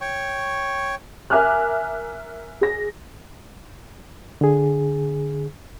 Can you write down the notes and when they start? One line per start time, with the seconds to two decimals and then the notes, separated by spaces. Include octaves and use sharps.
0.01 C#5 G5 C#6
1.30 A#4 E5 G#5 D6 F6 F#6
2.61 G#4 A#6
4.41 D3 G#4